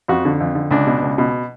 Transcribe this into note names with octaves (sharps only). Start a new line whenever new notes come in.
F2 F#4
D3
F2
D3
C#2 D4
B2
C#2
B2